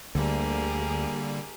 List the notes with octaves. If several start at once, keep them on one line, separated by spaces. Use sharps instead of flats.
D2 D3 G3 A#3 G4 G#4 A#4